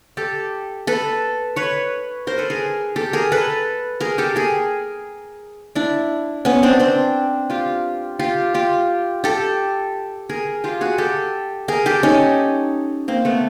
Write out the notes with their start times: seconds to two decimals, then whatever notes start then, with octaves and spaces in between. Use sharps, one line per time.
0.17 G4 A4
0.87 A4 B4
1.56 B4 C#5
2.27 A#4 C5
2.38 A4 B4
2.50 G#4 A#4
2.96 G4 A4
3.13 G#4 A#4
3.32 A4 B4
4.01 G#4 A#4
4.18 G4 A4
4.36 G#4 A#4
5.75 D4 E4
6.45 B3 C#4
6.63 C4 D4
6.80 C4 D4
7.50 F4 G4
8.19 F4 G4
8.54 F4 G4
9.24 G4 A4
10.29 G#4 A#4
10.64 F4 G4
10.81 F#4 G#4
10.98 G4 A4
11.68 G#4 A#4
11.86 G4 A4
12.03 C#4 D#4
13.08 A#3 C4
13.25 A3 B3